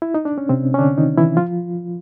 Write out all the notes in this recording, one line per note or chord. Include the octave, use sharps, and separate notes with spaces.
E4
D#4
D4
C#4
C3 C4
C#4
D3 D4
D#3 D#4
E3 E4
F3 F4